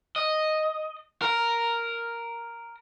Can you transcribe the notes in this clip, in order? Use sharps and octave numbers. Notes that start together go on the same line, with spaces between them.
D#5
A#4